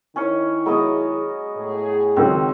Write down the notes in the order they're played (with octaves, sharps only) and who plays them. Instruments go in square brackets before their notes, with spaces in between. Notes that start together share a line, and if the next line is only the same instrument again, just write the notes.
[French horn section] D#3 E4 [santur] C#4 C#5 [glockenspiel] G#5 C#6 C#7
[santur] F#3 B3 D#5 [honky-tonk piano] G#3
[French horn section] A2 G#4
[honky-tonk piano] C#2 D#3 F#3 [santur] C4 [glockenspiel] C6 E6